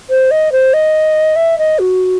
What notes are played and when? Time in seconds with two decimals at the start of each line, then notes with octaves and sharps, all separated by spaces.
0.10 C5
0.31 D#5
0.52 C5
0.73 D#5
1.36 E5
1.58 D#5
1.79 F#4